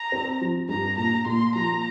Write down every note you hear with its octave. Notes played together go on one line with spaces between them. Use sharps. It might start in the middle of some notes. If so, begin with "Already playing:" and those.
Already playing: A#5
C4
F3
G2 A#5
A#2 A#5
A#2 C6
F3 A#5